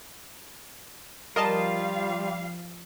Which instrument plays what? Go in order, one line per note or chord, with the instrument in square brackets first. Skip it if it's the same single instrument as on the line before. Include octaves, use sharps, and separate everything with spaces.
[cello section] F3 F5 [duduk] G3 [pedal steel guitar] F4 [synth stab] A#4 D#5 A5